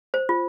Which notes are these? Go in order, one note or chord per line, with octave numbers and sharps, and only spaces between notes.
C5
F4